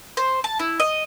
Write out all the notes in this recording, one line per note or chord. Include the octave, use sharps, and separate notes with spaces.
C5
A5
E4
D#5